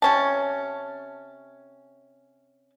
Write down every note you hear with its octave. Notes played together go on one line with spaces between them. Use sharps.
C3 C#4 A5